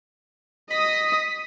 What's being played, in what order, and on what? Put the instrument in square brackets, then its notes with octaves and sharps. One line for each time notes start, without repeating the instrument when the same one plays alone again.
[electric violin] D#5 D#6 [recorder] B6